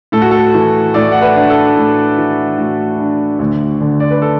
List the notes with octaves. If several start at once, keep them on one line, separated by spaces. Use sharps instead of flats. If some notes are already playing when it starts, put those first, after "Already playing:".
A2 A4
F#4
A4
E3
A2 A4 D5
F#5
B4 E5
D4
A4
A2
E3
A2 F#4
D4
D2
D3
D5
B4
A4